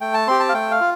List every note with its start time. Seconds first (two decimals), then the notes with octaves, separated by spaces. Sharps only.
0.01 A3 G5
0.14 A5
0.27 C4 G4 C6
0.40 A5
0.49 F5
0.53 A3 G5
0.71 F5
0.80 F4